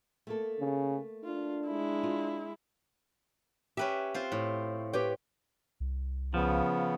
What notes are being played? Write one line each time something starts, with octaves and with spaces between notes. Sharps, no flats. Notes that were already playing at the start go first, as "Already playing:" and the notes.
A3 A#3 A4
C#3
D4 F4
G#3 E4
F4
C#4 G4 B4 E5
C4 F4 C5
A2
G4 B4 C#5 G5
C2
C#3 F3 B3